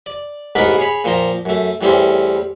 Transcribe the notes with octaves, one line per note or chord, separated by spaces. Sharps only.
D5
A1 G#2 B3 D#4 A#4 B5
G#4 C#5 B5
A#2 F3 G5 A#5
F#2 A3
E2 A2 G3 C4 C#4